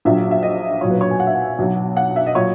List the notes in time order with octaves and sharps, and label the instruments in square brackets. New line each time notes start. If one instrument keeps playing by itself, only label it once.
[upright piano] A#1 A#2 F#3 E5
E5
D#5
B1 A#2 F#3 C#5
B4
C#5
G#5
F#5
E5
F#5
B1 B2 F#3
F#5
E5
D#5
A#2 F#3 C#5